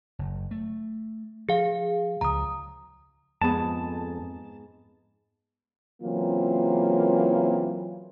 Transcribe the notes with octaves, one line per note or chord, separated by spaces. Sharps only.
F#1
A3
F3 G#4 F5
C#2 F3 A#5 D#6
F2 G#2 B3 G#4 A5
C#3 E3 F#3 A#3 C4 F4